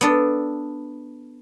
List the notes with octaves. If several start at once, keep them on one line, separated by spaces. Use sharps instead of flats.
B3 D4 A4